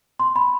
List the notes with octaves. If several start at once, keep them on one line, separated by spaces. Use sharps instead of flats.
C6
B5